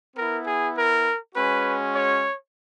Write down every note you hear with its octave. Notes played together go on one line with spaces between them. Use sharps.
B3 E4 A#4
G#4
A#4
G#3 C#4 F#4 B4
C#5